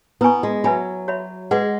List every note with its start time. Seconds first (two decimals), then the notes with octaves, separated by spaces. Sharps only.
0.21 B3 E4 B4 G#5 C#6
0.43 G#3
0.64 F#3 B4 E5 G#5 B5
1.08 F#4 C#5 E5 B5
1.51 G#3 G#4 B4 F#5